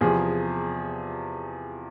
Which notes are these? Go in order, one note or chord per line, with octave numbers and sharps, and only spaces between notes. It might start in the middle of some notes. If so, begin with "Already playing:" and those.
E2 C3 F3 G#4